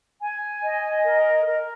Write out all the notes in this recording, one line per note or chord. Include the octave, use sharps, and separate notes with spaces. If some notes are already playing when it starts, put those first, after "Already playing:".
G#5
D#5
A#4
A#4